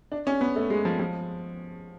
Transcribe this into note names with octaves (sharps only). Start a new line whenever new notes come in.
D4
C#4
B3
A3
G#3
F3
F3